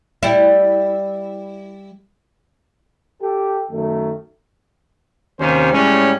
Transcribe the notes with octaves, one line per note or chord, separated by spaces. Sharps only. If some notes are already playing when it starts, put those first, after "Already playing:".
G3 E4
G4 A4
F#2 D#3 A3
D#2 C3 D#3 C#4 C5
A2 G3 G#3 C#4